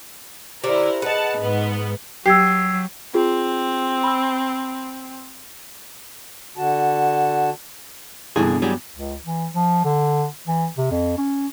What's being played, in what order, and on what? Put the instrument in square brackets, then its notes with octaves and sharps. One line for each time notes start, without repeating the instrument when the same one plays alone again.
[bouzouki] D3 [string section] E4 A#4 [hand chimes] G4 C5
[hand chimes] G#4 D#5 [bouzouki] B4 [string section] F#5 A5
[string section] G#2 B3
[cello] F#3 [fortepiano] G4 [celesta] E6 G#6 C7
[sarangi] C4 [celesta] F4 G#4
[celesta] B5 E6
[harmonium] D3 F#4 A5
[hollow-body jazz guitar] C2 D3 G#4 [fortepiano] G2 E3 [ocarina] B3
[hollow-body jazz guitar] F#3 G3 G#4
[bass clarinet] C#2
E3
F3
D3
E3
C3
F2
C#4